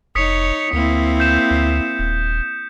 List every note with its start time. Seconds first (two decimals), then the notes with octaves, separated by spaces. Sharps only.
0.15 F1 D#4 C#5 D#6 B6 C#7
0.73 D2 A#3 C4 E4
1.20 G6 E7
1.51 D2
1.99 D#1